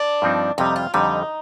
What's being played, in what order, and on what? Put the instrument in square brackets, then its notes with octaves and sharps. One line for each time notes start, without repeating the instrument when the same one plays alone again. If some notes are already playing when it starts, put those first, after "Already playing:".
Already playing: [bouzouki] D4
[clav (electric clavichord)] G2 F3 C4 D#4
[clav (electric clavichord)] F2 C3 G3 [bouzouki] D#4
[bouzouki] F4
[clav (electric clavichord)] F2 D3 G3 [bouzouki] D#4